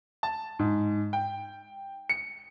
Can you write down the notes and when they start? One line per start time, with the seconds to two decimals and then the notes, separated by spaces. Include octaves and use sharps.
0.23 A5
0.59 G#2
1.13 G5
2.09 C#7